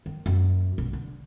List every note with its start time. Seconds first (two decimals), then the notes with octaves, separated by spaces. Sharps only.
0.06 D#3
0.26 F#2 A#3
0.78 A#1 B2
0.93 D3